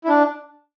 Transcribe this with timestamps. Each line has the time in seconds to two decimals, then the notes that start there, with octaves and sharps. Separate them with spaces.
0.04 E4
0.08 D4